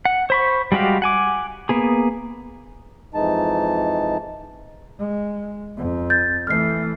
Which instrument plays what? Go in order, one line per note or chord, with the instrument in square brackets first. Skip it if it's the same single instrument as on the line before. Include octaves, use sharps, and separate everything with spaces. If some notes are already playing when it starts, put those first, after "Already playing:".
[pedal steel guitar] F#5
C5 B5 C#6
G3 G#3 F#4 G4 F5
F#5 G#5 D6
A#3 B3 G#4
[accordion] F2 E3 G#3 D#4 A5
[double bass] G#3
F2
[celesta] G6 A6
[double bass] E3 A3 [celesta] F6 C7